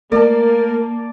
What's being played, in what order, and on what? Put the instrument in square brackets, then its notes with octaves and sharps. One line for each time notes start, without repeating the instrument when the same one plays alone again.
[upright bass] A3 [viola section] A#3 [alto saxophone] A#4 [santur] D5 A5